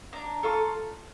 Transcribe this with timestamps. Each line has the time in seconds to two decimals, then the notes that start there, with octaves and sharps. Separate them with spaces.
0.13 D4 A#5
0.43 F4 A4 C#6